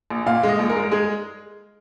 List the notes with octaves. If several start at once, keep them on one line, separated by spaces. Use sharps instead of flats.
A#1
A#2 F5
G#3 D#5
A#1
A#4
G#3
G#3 G#4